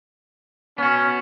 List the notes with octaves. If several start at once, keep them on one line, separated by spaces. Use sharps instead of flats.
B3 C#4 F#4